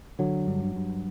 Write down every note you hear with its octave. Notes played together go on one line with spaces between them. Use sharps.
D3 F#3
G2
G2